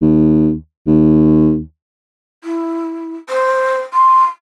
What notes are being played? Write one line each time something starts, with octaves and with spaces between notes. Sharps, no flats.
D#2
D#2
E4
C5
C6